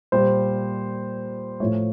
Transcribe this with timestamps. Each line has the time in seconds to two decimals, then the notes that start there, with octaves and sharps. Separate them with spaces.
0.12 A#2 G3 C5
1.60 A2 F3 A3 C#5